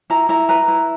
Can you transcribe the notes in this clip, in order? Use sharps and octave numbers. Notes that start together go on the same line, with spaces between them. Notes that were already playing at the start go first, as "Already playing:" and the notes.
E4 A#5
E4 A#5
B4 A#5
E4